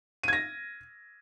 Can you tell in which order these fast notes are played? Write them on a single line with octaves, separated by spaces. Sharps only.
D#7 G#6 A#6